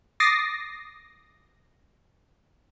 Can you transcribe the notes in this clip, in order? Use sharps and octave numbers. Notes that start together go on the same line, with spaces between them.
D6 D#6 A6 A#6 C7